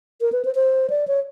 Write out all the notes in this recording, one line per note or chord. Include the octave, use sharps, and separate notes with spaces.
A#4
B4
C5
C5
D5
C#5